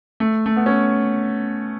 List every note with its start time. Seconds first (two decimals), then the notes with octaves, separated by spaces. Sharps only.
0.20 A3
0.46 A3
0.56 B3
0.66 C#4